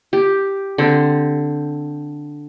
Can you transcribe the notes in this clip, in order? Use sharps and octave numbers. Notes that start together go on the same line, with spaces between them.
G4
D3 C4